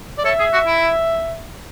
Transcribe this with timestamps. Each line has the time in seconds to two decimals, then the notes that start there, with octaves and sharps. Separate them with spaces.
0.18 D5
0.25 A4 C#5 E5
0.39 G#4
0.53 F#4
0.66 E4